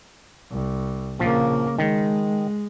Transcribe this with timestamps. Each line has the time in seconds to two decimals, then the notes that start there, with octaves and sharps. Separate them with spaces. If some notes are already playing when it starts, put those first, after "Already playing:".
0.51 C2
1.19 A#1 C#3 F3 A#3
1.79 D#3 G#3